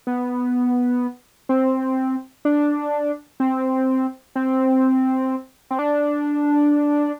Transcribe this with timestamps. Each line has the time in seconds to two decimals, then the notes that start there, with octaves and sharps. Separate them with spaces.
0.07 B3
1.49 C4
2.45 D4
3.40 C4
4.36 C4
5.71 C4
5.79 D4